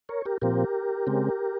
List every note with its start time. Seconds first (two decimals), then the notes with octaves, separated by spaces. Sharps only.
0.09 A#4 C#5
0.25 G4 A#4
0.42 A#2 F3 C4 G4 A#4
1.07 C#3 G#3 C4